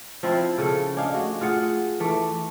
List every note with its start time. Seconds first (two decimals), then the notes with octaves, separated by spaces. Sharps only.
0.23 F3 C4 E4
0.58 C#3 A4
0.97 D4 D#5 F5 G#5
1.14 A3 F#4
1.41 F4 G#4 F#5
2.00 E3 A3 D6